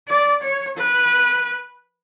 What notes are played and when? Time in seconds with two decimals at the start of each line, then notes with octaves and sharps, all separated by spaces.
0.08 D5
0.42 C#5
0.77 B4